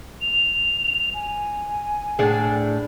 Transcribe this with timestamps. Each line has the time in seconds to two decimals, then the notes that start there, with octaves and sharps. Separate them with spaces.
0.21 F7
1.14 G#5
2.19 A2 D4 G#4